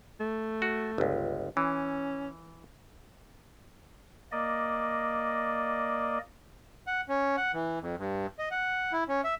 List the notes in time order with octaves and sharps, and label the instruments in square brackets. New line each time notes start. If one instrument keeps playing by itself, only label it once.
[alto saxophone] A3
[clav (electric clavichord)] F#4
G1 C#2
[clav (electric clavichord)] E3 [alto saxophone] C#4
[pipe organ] A#3 D5 D#5
[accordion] F#5
C#4
F#5
E3
F2
G2
D#5
F#5
E4
C#4
E5